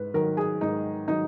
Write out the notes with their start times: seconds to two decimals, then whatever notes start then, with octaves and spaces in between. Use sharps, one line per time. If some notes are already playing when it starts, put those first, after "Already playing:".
Already playing: G#2 B4
0.14 D#3 F#3 A#4
0.37 G#4
0.61 G#2 D#4
1.08 D#3 F#3 D#4